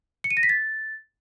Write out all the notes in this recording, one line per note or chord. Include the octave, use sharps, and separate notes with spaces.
C#7
D#7
A#6
B6
A6